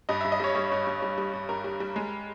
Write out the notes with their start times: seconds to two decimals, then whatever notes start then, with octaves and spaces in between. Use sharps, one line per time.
0.09 G2 D#5
0.21 E5
0.24 G2
0.32 D#5
0.40 G3 C#5
0.55 G3
0.72 G2
0.87 G2
1.02 G3
1.18 G3
1.33 G2
1.49 G2 A#4
1.64 G3
1.80 G3
1.96 G#3